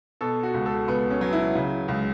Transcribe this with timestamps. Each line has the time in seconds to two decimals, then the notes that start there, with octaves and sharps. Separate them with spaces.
0.21 B2 A4
0.43 F#4
0.54 C#2
0.66 A4
0.88 C#2 B3
1.10 C#4
1.21 F#3
1.33 E4
1.55 C#3
1.88 C#2